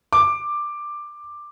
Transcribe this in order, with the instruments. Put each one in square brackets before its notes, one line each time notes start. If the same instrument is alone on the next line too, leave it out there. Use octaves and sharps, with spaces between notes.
[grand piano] D6